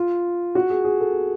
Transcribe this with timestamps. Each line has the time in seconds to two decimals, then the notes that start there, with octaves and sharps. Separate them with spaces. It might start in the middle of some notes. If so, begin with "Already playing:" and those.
Already playing: F4
0.55 F#4
0.70 G#4
0.84 G#4
1.00 A4